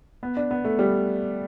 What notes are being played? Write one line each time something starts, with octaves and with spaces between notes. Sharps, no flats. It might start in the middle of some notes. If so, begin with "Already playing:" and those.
B3
D4
B3
A3
G3